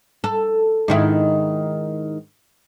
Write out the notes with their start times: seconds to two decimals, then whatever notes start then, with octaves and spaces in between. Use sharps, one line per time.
0.24 A4
0.88 G#2 D#3 E4